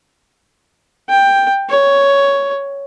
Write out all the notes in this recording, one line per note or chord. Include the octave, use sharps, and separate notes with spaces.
G5
C#5